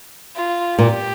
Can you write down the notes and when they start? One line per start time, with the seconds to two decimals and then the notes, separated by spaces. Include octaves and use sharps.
0.36 F4
0.78 A#2 G4